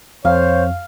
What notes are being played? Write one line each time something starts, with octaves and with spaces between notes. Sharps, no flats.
F2 C5 C#5 F5